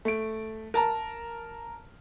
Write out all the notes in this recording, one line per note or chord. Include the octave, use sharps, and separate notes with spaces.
A3 D7
A#4 A5 A#5